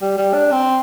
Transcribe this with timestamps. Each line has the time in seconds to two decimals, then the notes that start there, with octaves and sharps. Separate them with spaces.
0.02 G3
0.17 G3
0.34 D4
0.51 C4